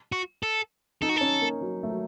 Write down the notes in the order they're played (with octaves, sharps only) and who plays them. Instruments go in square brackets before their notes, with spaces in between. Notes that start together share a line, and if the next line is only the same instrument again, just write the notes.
[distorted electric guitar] F#4
A4
[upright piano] D#4 [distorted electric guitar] A4
[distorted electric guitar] F#4
[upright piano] C#4 [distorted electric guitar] A4
[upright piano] A#3
F#3
A3
F#3